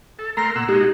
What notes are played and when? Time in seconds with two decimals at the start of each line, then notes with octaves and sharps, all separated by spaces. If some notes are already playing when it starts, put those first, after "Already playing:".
0.19 A4
0.37 A3 A#4 A#5 C6 A#6
0.56 A#2 F#5 E6
0.69 G#3 D#4 F#4 G4